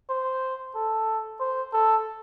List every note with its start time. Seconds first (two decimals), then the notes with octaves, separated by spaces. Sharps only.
0.10 C5
0.75 A4
1.40 C5
1.73 A4